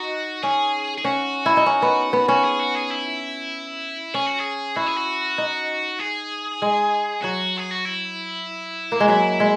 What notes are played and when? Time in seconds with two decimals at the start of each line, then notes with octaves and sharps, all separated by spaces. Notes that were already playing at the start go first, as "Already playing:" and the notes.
Already playing: D#4 F#4
0.43 C#4 G#4
0.98 G#4
1.05 C#4 F#4
1.46 E4
1.57 D#4
1.66 C#4
1.82 B3
2.13 B3
2.28 C#4 F#4
2.44 G#4
2.60 F#4
2.75 G#4
2.91 E4
4.14 C#4 G#4
4.27 F#4
4.39 G#4
4.76 E4 F#4
4.86 G#4
4.97 F#4
5.38 D#4
5.99 G#4
6.62 G#3
7.23 F#3 F#4
7.58 G#4
7.71 F#4
7.85 E4
8.92 A#3
9.00 G#3
9.08 F#3 E4
9.40 G#3